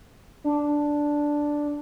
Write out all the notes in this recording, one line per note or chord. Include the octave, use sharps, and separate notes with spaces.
D4